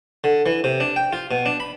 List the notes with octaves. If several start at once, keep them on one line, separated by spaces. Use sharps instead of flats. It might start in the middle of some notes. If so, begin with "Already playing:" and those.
D3
E3
C3
D4
G5
F4
B2
D4
B5